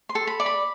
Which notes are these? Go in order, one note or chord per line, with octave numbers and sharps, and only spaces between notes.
C6
A4
B5
D5
B5